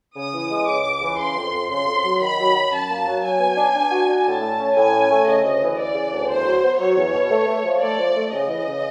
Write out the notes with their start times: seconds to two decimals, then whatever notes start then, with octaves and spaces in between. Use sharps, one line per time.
0.16 C#3 D#6
0.34 E3
0.50 G#3
0.67 C#3 D6
0.84 C#2
1.01 E3
1.18 C#3 C6
1.36 F2
1.53 F2
1.69 C#3 C6
1.86 F2
2.04 F#3
2.20 D#3 B5
2.38 F#3
2.55 F#3
2.71 F#2 A5
2.89 A#3
3.05 F#3
3.22 F#3 G#5
3.39 B3
3.56 D4
3.73 D4
3.91 F#4
4.08 D4
4.24 A2 A5
4.41 A3
4.59 C#4
4.76 A2 G#5
4.92 C#4
5.10 A3
5.26 C#3 D#5
5.44 D2
5.60 E3
5.77 E3 D5
5.95 C#3
6.11 D2
6.29 E2 C5
6.45 F#3
6.62 B3
6.79 F#3 C#5
6.97 E2
7.13 B2
7.30 A3
7.47 A3
7.65 F3
7.82 A3 D5
7.99 F3
8.16 A3
8.32 C#3 D#5
8.49 E3
8.67 C#3